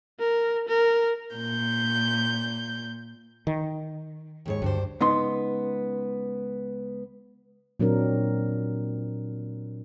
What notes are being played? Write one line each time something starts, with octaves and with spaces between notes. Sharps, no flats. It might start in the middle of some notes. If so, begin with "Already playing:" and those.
A#4
A#4
A#2 G6
D#3
D#2 G#2 C#5
D2 G2 D4 C5
C#2 B3 D#4 C6
A#2 F#3 C4 D4 A#4